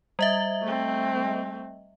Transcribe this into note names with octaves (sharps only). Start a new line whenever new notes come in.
G3 D#5 E5
A3 C4